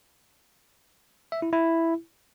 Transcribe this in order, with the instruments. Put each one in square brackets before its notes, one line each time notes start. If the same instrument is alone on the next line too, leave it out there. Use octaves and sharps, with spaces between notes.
[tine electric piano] E5
E4
E4